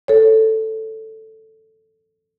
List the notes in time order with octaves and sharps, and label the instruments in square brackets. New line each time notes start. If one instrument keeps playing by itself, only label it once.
[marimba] A4 C#5